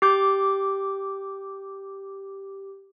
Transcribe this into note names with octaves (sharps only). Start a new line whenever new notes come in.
G4 D6 G6